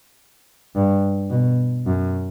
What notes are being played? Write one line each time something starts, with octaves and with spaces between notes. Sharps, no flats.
G2
B2
F#2